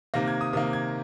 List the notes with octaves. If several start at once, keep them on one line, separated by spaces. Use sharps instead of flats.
C3 D#3 A#3 A#6
G#6
D#6
C3 D#3 A#3 D#6
G#6